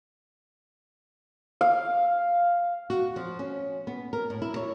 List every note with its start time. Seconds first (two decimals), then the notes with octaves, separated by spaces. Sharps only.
1.61 F5
2.90 F#4
3.16 F3
3.39 C#4
3.87 B3
4.13 A#4
4.30 A2
4.42 E4
4.56 C#5